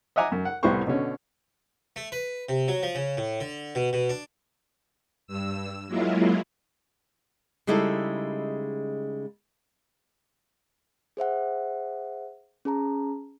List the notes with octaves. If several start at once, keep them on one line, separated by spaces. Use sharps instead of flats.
D#5 E5 F#5 G#5 A#5 D6
F#2
F#5
C2 A2 B3 G4 C5 C#6
B2 D3 C#4
A3
B4
C3
F#3
F3
C#3
A2
D3
B2
B2
D4
G2 E6
F#3 G#3 A#3 E4 F4
C#3 G3 G#3 D#4 E4 A4
G#4 C5 E5 F#5
C#4 G#4 A5 A#5